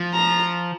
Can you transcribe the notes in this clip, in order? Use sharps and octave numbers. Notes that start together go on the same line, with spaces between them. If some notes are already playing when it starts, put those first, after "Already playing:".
Already playing: F3
A#5